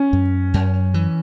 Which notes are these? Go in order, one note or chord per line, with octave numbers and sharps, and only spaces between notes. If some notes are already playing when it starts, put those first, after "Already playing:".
Already playing: C#4
F#2
F#2
E3